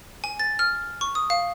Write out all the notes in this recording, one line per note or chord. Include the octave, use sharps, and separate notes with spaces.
G#5
A6
F6
C#6
D#6
F5